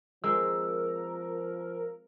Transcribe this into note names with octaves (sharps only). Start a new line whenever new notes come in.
F3 G#3 C4 A#4 E6